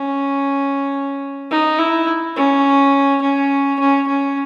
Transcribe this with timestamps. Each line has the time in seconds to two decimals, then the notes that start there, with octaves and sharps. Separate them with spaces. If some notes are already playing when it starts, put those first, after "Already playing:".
Already playing: C#4
1.51 D#4
1.79 E4
2.36 C#4
3.22 C#4
3.80 C#4
4.08 C#4